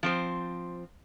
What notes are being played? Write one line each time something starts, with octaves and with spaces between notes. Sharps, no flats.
F3 C4 C5